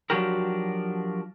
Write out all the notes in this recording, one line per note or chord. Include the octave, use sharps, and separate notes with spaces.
F3 F#3 D4 F#4 G4 A#4